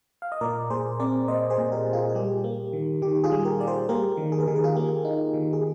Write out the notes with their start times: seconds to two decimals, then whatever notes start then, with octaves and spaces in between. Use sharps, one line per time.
0.22 F5
0.32 D#5
0.41 A#2 A#4 D5
0.70 A#2 G#4 C5
1.00 C4 A#4 D5
1.28 A#2 C5 D#5
1.50 G#4 C5
1.58 A#2
1.72 G4 A#4
1.86 A#2
1.93 F4 G#4
2.09 G#4
2.15 G3 G4
2.44 A#3
2.73 D#3
3.02 D#3 G4
3.24 F4 G#4
3.32 G3
3.45 G4 A#4
3.60 G3 D5
3.67 G#4 C5
3.89 A#3 G4 A#4
4.17 D#3
4.32 G#4
4.40 A#4
4.47 D#3 G#4
4.56 A#4
4.64 F4 G#4
4.75 A#3 G4
5.05 D#4
5.34 D#3
5.53 G#4